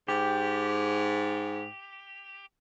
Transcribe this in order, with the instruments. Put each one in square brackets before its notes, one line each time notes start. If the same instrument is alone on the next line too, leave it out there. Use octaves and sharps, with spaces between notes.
[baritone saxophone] G#2 [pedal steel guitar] G4